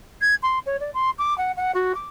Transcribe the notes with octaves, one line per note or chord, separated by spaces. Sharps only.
G#6
C6
C#5
D5
C6
D6
F#5
F#5
F#4
D6